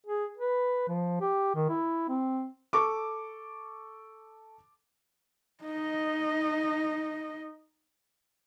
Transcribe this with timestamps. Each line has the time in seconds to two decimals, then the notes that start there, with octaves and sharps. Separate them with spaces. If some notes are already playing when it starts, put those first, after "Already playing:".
0.06 G#4
0.38 B4
0.88 F3
1.21 G4
1.55 D#3
1.69 E4
2.09 C4
2.73 A4 C#6 D6
5.64 D#4 D#5